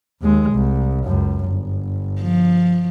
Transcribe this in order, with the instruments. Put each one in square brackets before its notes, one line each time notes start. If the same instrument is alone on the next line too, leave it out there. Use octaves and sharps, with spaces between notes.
[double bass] D#2 G#3
C2
C#2 F#2
G1
[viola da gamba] F3